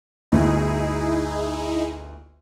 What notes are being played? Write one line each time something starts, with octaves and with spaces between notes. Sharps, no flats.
G1 D2 D#4 E4 G#4